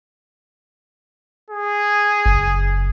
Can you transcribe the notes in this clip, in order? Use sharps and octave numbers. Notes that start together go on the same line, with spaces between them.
G#4
F#1